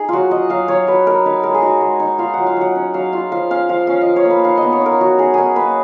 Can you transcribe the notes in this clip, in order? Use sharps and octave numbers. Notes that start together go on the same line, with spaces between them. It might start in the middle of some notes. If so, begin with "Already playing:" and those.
Already playing: D#4 G#4 D#5
F#3 F4 F#4
F#3 D#5
F#3 F5
F#3 C#5
F#3 B4
D#4 A#4
D#4 B4
G#3 A#4
G#4
D#4 F#4
G#3
D#4
F4 F5
F#3 F#5
F5
F#3 F#5
C#4
F#3 F5
F4 F5
F3 F5
C#4 F5
F3 F5
C#4 F5
D#5
F3
C#5
A#3 B4
D#4 F5
B3 D#5
C#5
D#4 A#4
F#3 F#4
D#4 G#4
D#4 G#4 A#4
A#3 B4